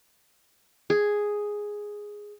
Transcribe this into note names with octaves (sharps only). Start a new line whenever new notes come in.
G#4